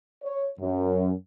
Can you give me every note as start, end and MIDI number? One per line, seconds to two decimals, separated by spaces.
0.24 0.48 73
0.59 1.11 42